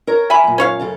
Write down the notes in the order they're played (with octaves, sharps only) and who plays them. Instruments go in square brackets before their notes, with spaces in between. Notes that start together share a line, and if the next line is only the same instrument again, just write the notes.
[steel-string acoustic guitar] A#4 C#5 A#5
[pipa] E5 G#5 B5
[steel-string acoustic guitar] F#2 A#2
[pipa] C#4 C#5 F5
[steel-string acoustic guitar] F#2 C#3 A4